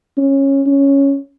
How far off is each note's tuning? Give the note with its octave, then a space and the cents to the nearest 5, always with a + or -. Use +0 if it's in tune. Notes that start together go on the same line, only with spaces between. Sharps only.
C#4 -15
C#4 +0